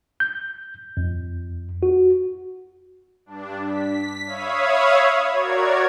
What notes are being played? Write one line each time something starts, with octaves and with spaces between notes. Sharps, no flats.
G6
F2
F#4
G2 D4
B6
C#5 E5 F5 B5 D#6 G#6
F#4 A#4 C#5 D5 G#6